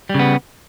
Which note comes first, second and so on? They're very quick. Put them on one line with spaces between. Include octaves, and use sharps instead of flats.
G3 C#3 B3